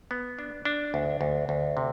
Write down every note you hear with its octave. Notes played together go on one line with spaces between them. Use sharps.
B3
D4
D4
D2
D2
D2
C3